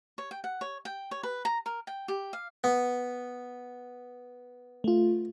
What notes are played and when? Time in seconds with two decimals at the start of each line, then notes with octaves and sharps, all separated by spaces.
0.18 C#5
0.31 G5
0.44 F#5
0.61 C#5
0.85 G5
1.11 C#5
1.23 B4
1.45 A#5
1.66 A#4
1.87 G5
2.08 G4
2.33 F5
2.64 B3
4.84 A3 F4